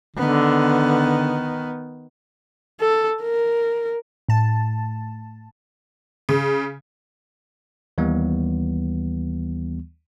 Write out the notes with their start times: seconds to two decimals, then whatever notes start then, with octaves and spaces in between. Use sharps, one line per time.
0.16 D3 D#3 B3
2.80 A4
3.23 A#4
4.29 A2 A5
6.29 C#3
7.98 D#2 E3 G3 B3